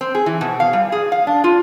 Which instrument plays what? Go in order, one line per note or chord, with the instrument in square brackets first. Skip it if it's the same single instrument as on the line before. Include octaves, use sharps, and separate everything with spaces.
[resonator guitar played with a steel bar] C4
G#4
E3
B2
F5
G3
G#4
F5
D4
F4